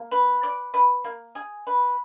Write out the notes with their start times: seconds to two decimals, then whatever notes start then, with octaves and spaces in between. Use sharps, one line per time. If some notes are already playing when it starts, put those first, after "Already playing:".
Already playing: A#3
0.11 B4
0.43 D5
0.74 B4
1.04 A#3
1.35 G#4
1.67 B4